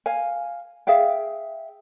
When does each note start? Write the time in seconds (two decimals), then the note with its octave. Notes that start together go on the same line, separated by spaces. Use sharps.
0.06 F5 G#5
0.87 G#4 E5 F5 G5